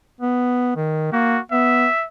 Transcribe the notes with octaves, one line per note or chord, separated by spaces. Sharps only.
B3
D#3
A#3 F#4
B3 E5